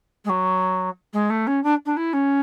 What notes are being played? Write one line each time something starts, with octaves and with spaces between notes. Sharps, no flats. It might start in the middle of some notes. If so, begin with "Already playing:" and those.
G#3
F#3
G#3
A3
C#4
D4
D4
E4
C#4